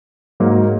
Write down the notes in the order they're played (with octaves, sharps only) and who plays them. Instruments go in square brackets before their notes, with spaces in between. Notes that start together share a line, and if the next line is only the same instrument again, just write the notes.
[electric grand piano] G#2 F#3 A#3